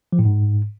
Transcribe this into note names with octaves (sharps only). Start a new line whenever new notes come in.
F3
A2
G#2